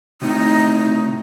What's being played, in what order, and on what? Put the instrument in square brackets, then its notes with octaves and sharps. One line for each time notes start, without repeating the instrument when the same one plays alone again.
[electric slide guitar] A2 C3 [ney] D#4